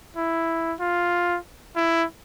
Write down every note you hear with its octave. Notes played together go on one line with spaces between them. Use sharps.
E4
F4
E4